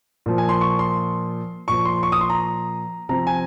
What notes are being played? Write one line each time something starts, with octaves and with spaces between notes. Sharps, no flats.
A#2 F3
G#5
C6
C#6
C6
A#2 F3 C#6
C6
C#6
D#6
C6
A#5
C3 F3 A#5
G#5